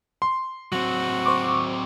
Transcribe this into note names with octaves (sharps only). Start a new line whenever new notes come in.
C6
F#3 C4 F#4
C5 C#6 D6